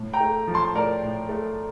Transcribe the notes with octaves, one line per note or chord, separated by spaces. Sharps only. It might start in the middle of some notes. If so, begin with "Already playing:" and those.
Already playing: A2
G5 A#5
A3
F3
A5 C6
A2 A#4 D5
A2
A3